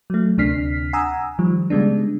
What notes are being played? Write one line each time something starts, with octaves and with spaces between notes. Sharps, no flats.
F#3 A3
D2 C3 D4 F6 B6 C7
F#5 G#5 A#5 D#6 E6
D#3 F3 G3
C#3 G3 G#3 B3 D4